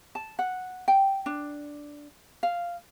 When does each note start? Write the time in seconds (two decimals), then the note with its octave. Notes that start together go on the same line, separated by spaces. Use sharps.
0.15 A5
0.39 F#5
0.88 G5
1.26 D4
2.43 F5